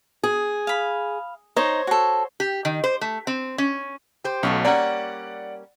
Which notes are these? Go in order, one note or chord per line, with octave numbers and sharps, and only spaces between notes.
G#4
F5 B5
D#4 C5 C#5 D#5
F#4 A4
G4
D#3
C5
A3
C4
C#4
G4 C5
B1 A3 B3 C#4
G3 A#3 C#4 D5 F#5